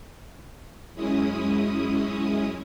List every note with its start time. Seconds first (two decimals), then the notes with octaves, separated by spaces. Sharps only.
0.95 F#2 G#3 C#4 E4 D#6